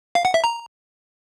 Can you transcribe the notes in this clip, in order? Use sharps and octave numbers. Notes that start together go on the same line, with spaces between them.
F5
F#5
E5
A#5